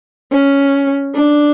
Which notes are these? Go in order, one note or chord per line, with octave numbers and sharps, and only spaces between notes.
C#4
D4